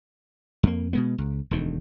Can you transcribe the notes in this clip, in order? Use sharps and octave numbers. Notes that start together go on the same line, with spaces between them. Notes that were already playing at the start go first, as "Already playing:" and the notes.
F2 A#3
B2 G#3 B3
C#2
E1 D2 D#3